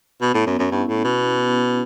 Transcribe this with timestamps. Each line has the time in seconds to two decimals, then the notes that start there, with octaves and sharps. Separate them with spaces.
0.22 B2 B3
0.34 A2 B3
0.46 F#2 B3
0.59 F#2 C#4
0.71 G2 E4
0.89 A2
1.04 B2